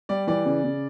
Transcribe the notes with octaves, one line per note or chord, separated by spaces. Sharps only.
G3 D5
E3 D5
C#3
C#3